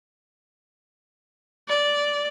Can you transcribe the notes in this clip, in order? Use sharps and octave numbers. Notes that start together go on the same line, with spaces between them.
D5